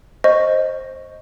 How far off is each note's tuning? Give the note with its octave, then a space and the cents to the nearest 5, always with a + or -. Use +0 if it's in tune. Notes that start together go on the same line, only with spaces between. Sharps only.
C5 +15 D#5 +0 C#6 +0